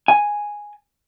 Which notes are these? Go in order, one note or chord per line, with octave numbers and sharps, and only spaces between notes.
G#5